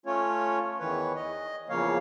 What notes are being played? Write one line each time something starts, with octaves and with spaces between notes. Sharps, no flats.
A3 C#4 F4 C#5
E2 D#3 E3 B4 C#5
D#5
E2 C#3 F3 A#3 C#5 F5